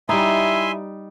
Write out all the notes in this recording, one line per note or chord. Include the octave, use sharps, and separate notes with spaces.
G3 D#4 E4 E5 G#5 C6